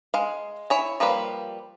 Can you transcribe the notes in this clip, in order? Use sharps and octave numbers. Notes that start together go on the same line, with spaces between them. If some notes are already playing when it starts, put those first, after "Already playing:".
G#3 F5
E4 C#5 G#5
F3 G3 A#3 B4 C5